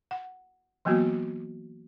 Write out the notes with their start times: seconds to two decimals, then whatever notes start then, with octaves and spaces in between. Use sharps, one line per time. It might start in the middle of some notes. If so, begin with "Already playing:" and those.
0.11 F#5
0.85 E3 F#3 A#3 B3 F#4